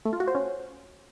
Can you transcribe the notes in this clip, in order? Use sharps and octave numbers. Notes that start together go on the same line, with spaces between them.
A3
F4
F#4
C5
C#4